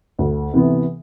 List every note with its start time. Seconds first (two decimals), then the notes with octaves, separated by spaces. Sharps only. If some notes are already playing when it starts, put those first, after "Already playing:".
0.19 D2
0.53 C3 E3 B3